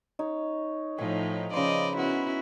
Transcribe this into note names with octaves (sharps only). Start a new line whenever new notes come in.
D#4 C#5
A2 F3 D#4 G#5
C#3 F3 B4 C5 D5 D#5
B3 C#4 E4 F#4